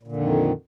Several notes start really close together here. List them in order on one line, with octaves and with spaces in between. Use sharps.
A#2 D3 F2 D#3